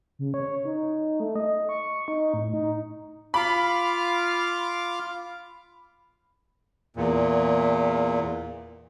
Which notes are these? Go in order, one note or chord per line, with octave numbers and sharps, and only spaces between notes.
C#3
C#5
D#4
A3
D#5
C#6
D#4
A2
D#4
F4 F5 B5 D6
E2 A#2